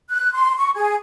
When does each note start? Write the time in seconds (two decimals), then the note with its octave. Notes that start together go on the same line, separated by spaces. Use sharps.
0.10 F#6
0.33 C6
0.57 C#6
0.75 G#4